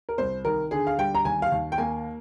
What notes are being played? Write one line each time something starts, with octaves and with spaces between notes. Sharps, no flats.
A#4
C2 C5
D#3 A#4
D3 G#4
F5
G3 G5
A#5
D#2 G#5
F5
D#2
G5
A#3 G#5